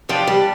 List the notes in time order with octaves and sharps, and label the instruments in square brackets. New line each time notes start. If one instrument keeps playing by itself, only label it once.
[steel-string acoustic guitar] F3 [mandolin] B3 D4 G4 D5
[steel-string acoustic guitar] G3